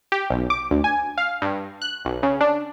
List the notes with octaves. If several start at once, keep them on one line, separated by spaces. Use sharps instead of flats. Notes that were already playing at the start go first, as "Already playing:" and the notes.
G4
B1
D6
D2
G#5
F5
G2
F#6
B1
C#3
D4